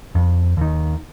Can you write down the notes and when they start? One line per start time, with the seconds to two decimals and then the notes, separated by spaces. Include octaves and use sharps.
0.15 F2
0.57 D#2 D#3